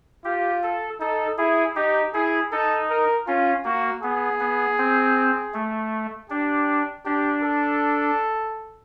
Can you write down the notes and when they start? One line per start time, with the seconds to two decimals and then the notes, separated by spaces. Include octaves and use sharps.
0.24 F4 G4
0.63 A4
1.00 D#4 A4
1.38 E4 G#4
1.76 D#4 G4
2.14 E4 G#4
2.52 D#4 A4
2.90 A#4
3.27 C#4 F4
3.64 A#3 F#4
4.03 B3 G#4
4.40 B3
4.78 C4
5.54 A3
6.30 D4 G4
7.05 D4 G4
7.42 A4